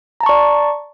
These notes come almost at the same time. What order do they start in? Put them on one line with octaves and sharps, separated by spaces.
A#5 A5 C#6 D5